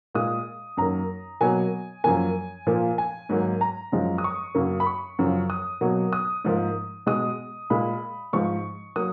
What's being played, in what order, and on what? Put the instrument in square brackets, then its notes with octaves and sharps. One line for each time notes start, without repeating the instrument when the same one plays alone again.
[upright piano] A#2 G#3 D#6
F#2 D#3 A#3 A#5
B2 F#3 A#3 G#5
F#2 F3 A#3 G#5
A#2 F3 A#3
G#5
G#2 D#3 F#3 A#3
A#5
F#2 F3 G#3
D#6
C#6
F#2 C#3 F#3 A#3
B5
C#6
F#2 C#3 F3
D#6
B2 F#3 A#3
D#6
G#2 F3 A#3
B2 G#3 D#6
A#2 G#3 B5
G#2 F3 G#3 C#6
F#3 A#3 D#6